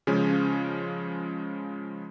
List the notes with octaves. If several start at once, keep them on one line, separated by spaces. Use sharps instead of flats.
C#3 F3 G#3 C#4